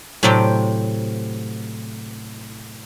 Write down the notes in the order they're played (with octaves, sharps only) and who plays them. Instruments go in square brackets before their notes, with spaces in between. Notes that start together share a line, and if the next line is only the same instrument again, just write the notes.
[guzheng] A2 C3 F#3 C4 G4 D5